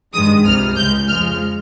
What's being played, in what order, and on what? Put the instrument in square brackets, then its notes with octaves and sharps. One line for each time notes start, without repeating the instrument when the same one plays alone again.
[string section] G2 D#3 G#3 D#6
C#2 C3 G3 F6
C#2 C#3 G#3 G6
F2 C#3 F3 G#3 F6